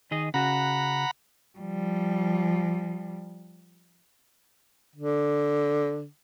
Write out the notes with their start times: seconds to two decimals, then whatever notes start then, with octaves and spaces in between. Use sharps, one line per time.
0.11 D#3 G#4 D#5
0.34 C#3 F#4 F#5 A#5 B5
1.59 F3 G3
4.96 D3